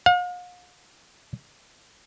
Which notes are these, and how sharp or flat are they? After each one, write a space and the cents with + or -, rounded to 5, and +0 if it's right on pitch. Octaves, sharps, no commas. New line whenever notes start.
F5 +45